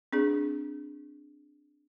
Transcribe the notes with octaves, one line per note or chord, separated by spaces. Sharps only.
C4 D4 G#4